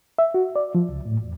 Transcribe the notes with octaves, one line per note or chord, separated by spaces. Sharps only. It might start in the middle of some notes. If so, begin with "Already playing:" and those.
E5
F#4
D5
F3
C#2
A2
E2